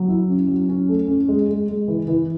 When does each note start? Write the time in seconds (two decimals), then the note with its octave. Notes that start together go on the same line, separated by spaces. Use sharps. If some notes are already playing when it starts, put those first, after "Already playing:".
Already playing: F#3
0.08 E4
0.29 C#4
0.48 F#3
0.69 C#4
0.89 A3
1.08 C#4
1.28 G#3
1.49 G#3
1.69 G#3
1.88 E3
2.08 E3